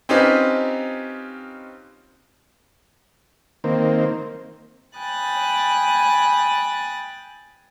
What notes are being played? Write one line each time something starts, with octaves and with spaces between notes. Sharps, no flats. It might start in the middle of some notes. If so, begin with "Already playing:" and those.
C4 C#4 D#4 F4 G4 B4
D#3 A#3 C4
G5 G#5 B5 D#6 F#6 A6